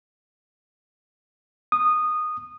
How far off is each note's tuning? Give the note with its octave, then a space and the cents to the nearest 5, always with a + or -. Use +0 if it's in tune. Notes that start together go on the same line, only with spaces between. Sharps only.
D#6 -15